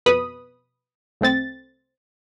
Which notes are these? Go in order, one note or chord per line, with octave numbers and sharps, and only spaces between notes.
F2 B2 B4 B5 D#6
C2 A3 C4 A6